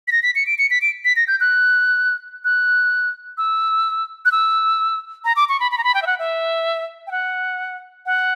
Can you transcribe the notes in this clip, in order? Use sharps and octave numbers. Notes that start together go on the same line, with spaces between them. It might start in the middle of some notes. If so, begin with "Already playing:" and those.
B6
A#6
B6
C#7
D7
C#7
B6
D7
B6
A#6
G6
F#6
F#6
E6
F#6
E6
A#5
D6
C#6
B5
B5
A#5
B5
G5
E5
F#5
E5
G5
F#5
F#5